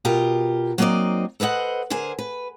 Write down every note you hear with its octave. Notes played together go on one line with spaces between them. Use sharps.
B2 F4 G4 A#4
F#3 A#3 C4 D#4 D5 D#5
A4 B4 C5 D#5 F#5
D3 G#4 A#4 C5 G#5
B4